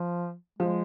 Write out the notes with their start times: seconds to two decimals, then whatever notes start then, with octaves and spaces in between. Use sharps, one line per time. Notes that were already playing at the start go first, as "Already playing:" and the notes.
Already playing: F3
0.59 F3 G#3